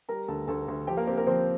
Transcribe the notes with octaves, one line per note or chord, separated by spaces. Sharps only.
G3 A#4 A#5
D2 A4 A5
D2 A4 A5
D2
F3 G4 G5
A#3 A#4
C4 G4
A#3 A#4
F3 C4 C5